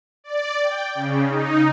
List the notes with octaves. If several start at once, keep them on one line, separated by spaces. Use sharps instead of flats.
D5
G5
C#3
D#4